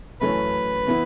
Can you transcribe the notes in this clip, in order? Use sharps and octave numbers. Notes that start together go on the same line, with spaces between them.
F#2 E3 A3 C#4 B4
E3 B3 E4